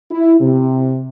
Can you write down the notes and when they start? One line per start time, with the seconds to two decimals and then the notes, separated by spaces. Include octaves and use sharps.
0.10 E4
0.41 C3